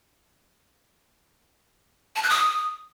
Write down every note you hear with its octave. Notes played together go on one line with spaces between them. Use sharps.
A5
F#6
D#6